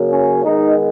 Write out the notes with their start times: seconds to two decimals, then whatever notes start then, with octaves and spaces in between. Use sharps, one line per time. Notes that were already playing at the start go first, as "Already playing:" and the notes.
Already playing: C#3 F#3 A#3
0.10 C#4
0.44 D#3 G#3 B3 D#4